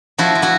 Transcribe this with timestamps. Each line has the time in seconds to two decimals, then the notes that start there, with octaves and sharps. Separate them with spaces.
0.18 F3 E4 F#4
0.35 F3
0.42 E4 F#4